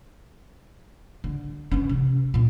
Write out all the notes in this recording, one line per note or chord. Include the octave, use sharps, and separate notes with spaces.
D3
E3 C#4
C3
A#2 F4